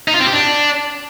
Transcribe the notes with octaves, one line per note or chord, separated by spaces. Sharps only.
D#4
F4
C4
G4
D4